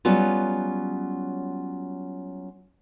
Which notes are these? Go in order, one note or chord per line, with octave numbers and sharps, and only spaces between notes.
F#3 G3 B3 C#4 F4